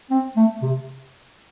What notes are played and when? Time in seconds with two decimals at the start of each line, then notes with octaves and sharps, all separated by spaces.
0.11 C4
0.36 A3
0.62 C3